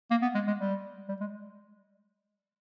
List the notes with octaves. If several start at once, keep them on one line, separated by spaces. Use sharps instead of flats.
A#3
B3
G#3
G#3
G3
G3
G#3